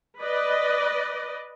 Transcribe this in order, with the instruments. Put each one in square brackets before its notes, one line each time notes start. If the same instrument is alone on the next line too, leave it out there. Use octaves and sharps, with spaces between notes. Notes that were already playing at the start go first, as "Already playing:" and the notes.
[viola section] B4 D5 D#5